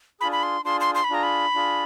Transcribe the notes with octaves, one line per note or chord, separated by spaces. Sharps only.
D4 F4 G#4 B5
B5
C6
D4 F4 G#4 C6
C6
C6
B5
D4 F4 G#4 A#5
B5
D4 F4 G#4